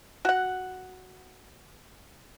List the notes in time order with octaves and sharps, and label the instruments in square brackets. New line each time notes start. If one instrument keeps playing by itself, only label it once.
[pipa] F#4 F#5